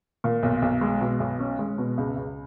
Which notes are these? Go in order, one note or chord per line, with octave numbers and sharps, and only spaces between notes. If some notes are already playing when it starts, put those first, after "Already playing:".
A#2
B1
B1
G#3
B2
B1
C#4
G#3
B2
C#2
C#2